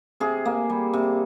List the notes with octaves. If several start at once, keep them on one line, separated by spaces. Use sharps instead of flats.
C3 G#4
A#3
G3
C3